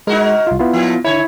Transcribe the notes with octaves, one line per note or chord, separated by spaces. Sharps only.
G#3 D#4 F#4 A#4
C2 F4
B3 E4 F4
A#2 F3
D3 E4 C#5